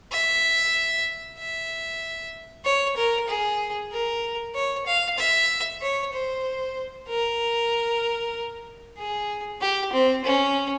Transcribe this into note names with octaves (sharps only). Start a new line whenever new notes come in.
E5
E5
C#5
A#4
G#4
A#4
C#5
F5
E5
C#5
C5
A#4
G#4
G4
C4
C#4